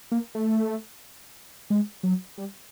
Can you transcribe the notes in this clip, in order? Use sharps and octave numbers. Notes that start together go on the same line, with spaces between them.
A#3
A3
G#3
F#3
G3